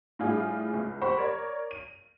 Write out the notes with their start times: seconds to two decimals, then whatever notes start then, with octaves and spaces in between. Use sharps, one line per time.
0.19 A2 G3 D4 F4 G#4
0.74 C#2
1.01 G4 C5 F#5 B5 C#6
1.17 A#4 C#5 D5
1.71 D#7